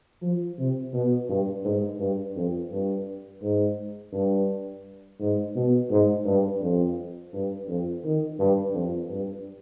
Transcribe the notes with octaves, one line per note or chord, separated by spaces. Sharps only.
F3
C3
B2
G2
G#2
G2
F2
G2
G#2
G2
G#2
B2
G#2
G2
F2
G2
F2
D#3
G2
F2
G2